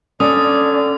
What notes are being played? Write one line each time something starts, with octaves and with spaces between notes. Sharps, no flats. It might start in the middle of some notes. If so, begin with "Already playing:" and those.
D3 C#4 D5 D#6